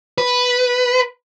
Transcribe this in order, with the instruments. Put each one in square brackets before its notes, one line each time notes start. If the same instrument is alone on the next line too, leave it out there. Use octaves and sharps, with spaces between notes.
[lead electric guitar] B4